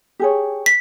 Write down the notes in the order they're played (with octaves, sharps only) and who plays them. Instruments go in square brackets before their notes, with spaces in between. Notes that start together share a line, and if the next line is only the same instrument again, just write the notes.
[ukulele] G4 G#4 C#5
[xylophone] B6